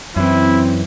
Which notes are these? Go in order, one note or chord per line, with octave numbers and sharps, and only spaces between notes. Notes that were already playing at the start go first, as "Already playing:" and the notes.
F#2 E3 C4 E4